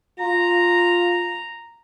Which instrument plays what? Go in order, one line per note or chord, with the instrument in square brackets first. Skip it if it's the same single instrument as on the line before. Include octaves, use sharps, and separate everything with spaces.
[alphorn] F4 [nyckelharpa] A#5